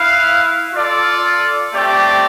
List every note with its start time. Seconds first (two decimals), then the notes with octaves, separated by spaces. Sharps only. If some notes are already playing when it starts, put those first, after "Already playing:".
Already playing: E4 B4 F5
0.73 F4 A4 D5
1.73 A3 C4 G4 D5